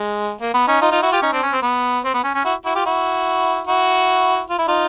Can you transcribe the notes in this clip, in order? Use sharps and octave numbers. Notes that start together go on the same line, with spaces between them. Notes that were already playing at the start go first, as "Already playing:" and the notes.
Already playing: G#3
A#3
B3
C#4 D#4
D#4 F4
D#4 F4
E4 F#4
F4 G4
C#4 D#4
C4 D4
C#4
C4
B3
C4
B3
C#4
C#4
E4 F#4
E4 F#4
F4 G4
E4 F#4
E4 F#4
F4
E4
D#4 F4